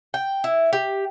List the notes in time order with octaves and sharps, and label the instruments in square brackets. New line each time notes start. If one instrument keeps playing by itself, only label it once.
[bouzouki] G5
E4
G4